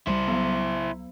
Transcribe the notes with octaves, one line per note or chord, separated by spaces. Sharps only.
C2 G3 E4 C5
F#3 B3